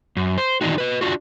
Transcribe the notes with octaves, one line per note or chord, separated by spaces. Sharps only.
F#2
C5
D#3 E3 D4 D#4 F#4
B4 D#5
D4 F4 F#4